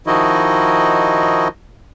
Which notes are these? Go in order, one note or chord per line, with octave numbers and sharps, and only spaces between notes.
D#3 F3 D#4 E4 F#4 D#5